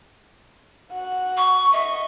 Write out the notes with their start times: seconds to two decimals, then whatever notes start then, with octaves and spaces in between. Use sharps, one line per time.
0.93 F#4 F#5
1.37 C#6
1.72 D#5 E5 C#6